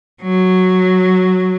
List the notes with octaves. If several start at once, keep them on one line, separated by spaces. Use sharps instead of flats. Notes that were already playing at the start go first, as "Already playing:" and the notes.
F#3